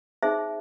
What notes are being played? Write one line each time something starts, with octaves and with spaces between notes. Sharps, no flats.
D#4 G#4 C5 E5